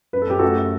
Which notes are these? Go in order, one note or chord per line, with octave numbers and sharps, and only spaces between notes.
F#2 B4
A4
F#2 G4
A3 F#4 A4
A3